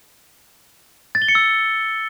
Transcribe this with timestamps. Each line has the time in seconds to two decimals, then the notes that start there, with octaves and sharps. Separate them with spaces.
1.15 A6
1.22 G7
1.28 C#7
1.35 E6